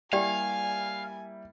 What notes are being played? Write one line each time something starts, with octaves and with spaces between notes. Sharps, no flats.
G3 A#3 E4 G4 D5 F5 G5 G#5